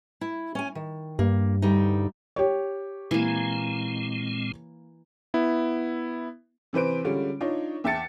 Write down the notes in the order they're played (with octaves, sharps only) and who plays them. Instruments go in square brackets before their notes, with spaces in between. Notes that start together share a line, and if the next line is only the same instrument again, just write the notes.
[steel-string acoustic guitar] E4
C#4 G#5
D#3
[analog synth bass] G2 [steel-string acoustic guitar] A#3
[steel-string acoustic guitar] D2 G3 D#4
[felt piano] G4 C#5
[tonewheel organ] A#2 G#3 C4 [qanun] E3 A#3
[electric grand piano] B3 E4
[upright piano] C3 E3 B4 C5 D7
D3 G3 G#3 C#4 F4
D4 D#4 F4 C#5
E2 E5 G5 A5 A6 C#7